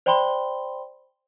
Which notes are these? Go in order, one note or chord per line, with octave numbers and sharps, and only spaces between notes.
C5 D5 G5 B5 C6 G7